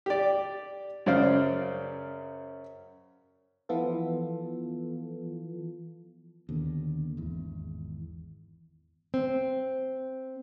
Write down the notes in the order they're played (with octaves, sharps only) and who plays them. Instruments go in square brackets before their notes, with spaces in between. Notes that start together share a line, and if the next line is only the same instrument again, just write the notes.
[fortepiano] G4 D5
F#2 C#3 C5 D5 F5
[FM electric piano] E3 F3 B3 F4 A4
[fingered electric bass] D#2 B2 D3
G#1 E2
[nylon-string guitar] C4